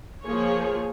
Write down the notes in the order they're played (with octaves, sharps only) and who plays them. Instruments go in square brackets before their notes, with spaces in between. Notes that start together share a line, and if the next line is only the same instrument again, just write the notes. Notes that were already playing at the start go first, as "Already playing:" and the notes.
[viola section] F3 A#3 G#4 C#5